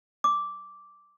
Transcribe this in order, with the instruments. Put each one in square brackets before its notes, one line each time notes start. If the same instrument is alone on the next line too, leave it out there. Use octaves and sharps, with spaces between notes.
[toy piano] D6